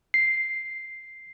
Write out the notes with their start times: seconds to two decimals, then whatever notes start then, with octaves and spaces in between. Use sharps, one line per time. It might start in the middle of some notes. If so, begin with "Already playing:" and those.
0.14 C7